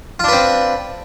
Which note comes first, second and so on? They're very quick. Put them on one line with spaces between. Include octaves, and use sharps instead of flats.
F4 D4 B4 C4